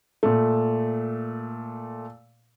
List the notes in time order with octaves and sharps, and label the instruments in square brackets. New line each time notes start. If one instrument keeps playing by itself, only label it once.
[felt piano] A#2 A3